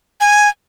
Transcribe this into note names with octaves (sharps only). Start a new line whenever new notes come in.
G#5